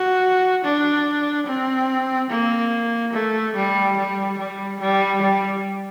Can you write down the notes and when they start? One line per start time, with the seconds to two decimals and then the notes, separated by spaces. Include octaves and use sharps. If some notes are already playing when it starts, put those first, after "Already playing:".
Already playing: F#4
0.64 D4
1.47 C4
2.30 A#3
3.13 A3
3.55 G3
3.97 G3
4.38 G3
4.80 G3
5.22 G3